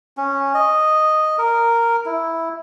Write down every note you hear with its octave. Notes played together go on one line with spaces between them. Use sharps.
C#4
D#5
A#4
E4